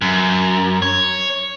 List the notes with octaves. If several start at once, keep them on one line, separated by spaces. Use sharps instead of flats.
F#2
C#5